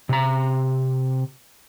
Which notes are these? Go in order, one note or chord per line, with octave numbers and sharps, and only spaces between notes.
C3 A#5